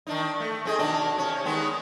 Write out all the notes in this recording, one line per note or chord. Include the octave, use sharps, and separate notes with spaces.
D#3 D4 D#4
A3
C4 G#4 D#5
B2 D#3 D4
C3 C#4
D#3 G#3 B3